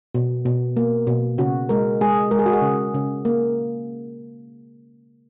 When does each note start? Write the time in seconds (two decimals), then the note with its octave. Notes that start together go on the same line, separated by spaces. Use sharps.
0.15 B2
0.46 B2
0.77 A#3
1.07 B2
1.38 C#3 F#4
1.69 G#3 A#4
2.01 G#3 G#4
2.31 G#3 A#4
2.39 G#4
2.46 F#4
2.53 G#4
2.62 C#3
2.94 C#3
3.25 A#3